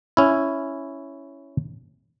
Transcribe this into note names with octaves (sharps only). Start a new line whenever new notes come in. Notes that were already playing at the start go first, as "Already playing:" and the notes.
C#4 E4